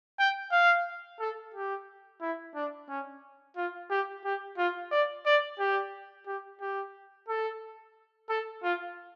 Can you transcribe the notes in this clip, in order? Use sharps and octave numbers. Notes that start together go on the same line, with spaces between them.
G5
F5
A4
G4
E4
D4
C#4
F4
G4
G4
F4
D5
D5
G4
G4
G4
A4
A4
F4